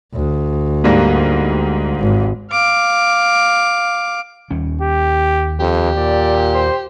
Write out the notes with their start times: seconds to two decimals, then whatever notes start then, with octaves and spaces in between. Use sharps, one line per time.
0.14 D2
0.84 G#2 G3 A#3
1.99 G#1
2.51 F5 D6
4.51 D#2 G3 C#4
4.81 G4
5.60 F2 G4
5.97 A#2 D5
6.54 C5